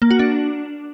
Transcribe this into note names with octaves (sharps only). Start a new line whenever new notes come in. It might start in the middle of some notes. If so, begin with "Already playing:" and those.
A#3
F#4
D4